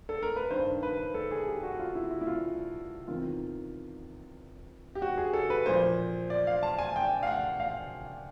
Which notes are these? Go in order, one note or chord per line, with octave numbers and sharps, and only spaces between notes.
A4
A#4
B4
G2 D#3 C5
B4
A4
G#4
G4
F#4
F4
E4
E4
E4
F4
E2 C3 D#3 F4
G4
F#4
G#4
A4
B4
A#2 F3 C5
D5
F5
A5
G#5
G5
F5
F#5
F5